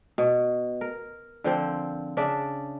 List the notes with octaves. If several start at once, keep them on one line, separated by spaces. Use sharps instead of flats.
B2
A#4
D3 F3 C4
C#3 D4 D5 E5